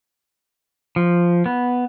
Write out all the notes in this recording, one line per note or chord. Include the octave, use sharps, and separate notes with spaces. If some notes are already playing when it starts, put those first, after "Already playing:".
F3
B3